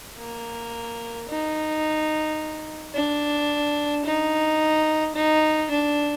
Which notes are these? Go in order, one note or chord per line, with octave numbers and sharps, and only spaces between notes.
A#3
D#4
D4
D#4
D#4
D4